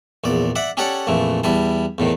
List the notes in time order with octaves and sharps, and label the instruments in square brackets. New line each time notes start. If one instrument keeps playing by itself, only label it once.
[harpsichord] A#1 E2 D5
D5 E5 F#5
C#4 G4 A4 C#5 D5 F#5
A#1 F2 E3 A3
E2 G3 E4 A5
E2 A2 D#3